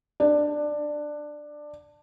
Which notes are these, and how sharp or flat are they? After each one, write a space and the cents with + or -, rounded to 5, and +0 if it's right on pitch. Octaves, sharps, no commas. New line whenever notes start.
D4 +10